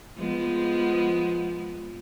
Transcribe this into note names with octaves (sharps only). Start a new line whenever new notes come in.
F3 G#3 B3